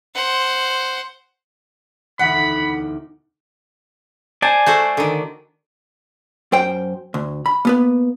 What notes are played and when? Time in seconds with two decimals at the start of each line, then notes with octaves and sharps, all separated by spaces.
0.15 C5 F#5
2.19 E1 D2 D#4 F#5 B5
4.42 C5 D5 G#5 A5
4.66 A3 F#4 C5
4.97 D3 D#3
6.52 F#2 C5 G5
7.14 D2
7.46 B5
7.65 A#3 B3 B4